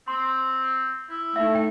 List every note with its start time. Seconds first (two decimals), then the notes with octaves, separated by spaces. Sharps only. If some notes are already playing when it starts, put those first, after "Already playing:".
0.08 C4 C6
1.10 E4
1.36 A3 D#4 E5
1.55 G5